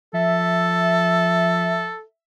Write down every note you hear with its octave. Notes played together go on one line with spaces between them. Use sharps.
F3 A4 E5